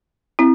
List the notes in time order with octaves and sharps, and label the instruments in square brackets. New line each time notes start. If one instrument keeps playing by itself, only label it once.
[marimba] C4 E4